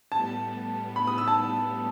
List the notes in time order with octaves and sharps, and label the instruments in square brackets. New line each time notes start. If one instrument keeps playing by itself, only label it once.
[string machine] A2 G3 B3 [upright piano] A5
[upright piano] B5
D#6
E6
A5